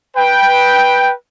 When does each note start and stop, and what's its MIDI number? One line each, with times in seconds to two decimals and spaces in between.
0.17 1.12 71
0.17 1.12 79